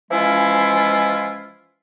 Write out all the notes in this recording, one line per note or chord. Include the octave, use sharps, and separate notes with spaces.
E3 F3 G#3 C#4 E4 F4